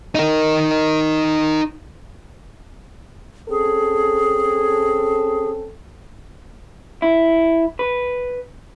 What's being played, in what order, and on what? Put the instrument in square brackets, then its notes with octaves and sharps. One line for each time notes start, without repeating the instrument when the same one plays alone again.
[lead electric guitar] D#4 A#4
[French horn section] C4 C#4 A4 [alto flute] G#4
[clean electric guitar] E4
B4